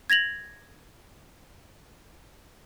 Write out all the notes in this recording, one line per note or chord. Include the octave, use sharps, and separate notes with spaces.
G#6 A#6 F7 F#7